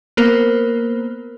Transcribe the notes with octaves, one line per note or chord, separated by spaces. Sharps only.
A#3 B3 A#4 C5